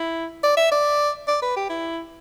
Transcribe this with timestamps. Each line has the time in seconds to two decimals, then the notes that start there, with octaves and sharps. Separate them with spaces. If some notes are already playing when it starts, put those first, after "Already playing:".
Already playing: E4
0.43 D5
0.57 E5
0.71 D5
1.28 D5
1.42 B4
1.56 G4
1.69 E4